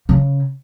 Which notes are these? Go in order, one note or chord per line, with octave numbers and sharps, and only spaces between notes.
C#3